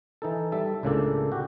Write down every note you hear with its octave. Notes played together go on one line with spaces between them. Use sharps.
E3 D#4 A4
G3 A4 E5
C#2 A2 C#3 A#3 D4 A4
F#4 G4